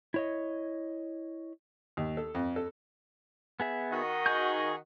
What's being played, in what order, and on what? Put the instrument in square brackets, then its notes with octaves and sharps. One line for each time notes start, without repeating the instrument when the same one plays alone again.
[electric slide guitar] E4 C#5 D#5
[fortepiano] D#2
A4
F2
A4
[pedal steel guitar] B3 G#4 E5
[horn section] D#3 F#4 D#5
[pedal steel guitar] G#4 C#6 G6